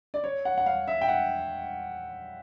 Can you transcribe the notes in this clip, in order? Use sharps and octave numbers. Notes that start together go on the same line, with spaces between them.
D5
C#5
F#5
F#5
F5
E5
G5
F#5